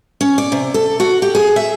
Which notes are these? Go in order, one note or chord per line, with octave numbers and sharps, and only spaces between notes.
C#4
D5
C3
A4
F#4
G4
G#4
E5